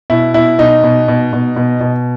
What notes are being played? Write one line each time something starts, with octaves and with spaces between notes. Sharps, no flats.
B2 E4
B2 E4
B2 D#4
B2
B2
B2
B2
B2